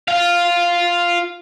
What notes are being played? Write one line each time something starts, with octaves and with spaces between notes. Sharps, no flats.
F4 F5